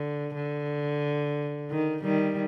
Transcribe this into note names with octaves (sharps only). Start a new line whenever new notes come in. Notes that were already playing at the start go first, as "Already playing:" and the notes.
Already playing: D3
D3
D#3
D#3 G3